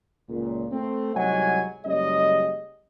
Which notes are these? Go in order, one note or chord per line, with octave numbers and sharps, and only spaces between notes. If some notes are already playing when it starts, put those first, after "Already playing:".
C#2 A#2
A3 C4
C2 G#2 F#3 D#5 F#5 G#5
F#1 G3 G#3 C#4 D#5